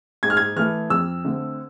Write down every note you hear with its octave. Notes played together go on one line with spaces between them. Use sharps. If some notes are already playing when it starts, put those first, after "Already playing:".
G#2 G#6
F6
G#6
E3 A3 F6
F2 E6
D3 A3 C4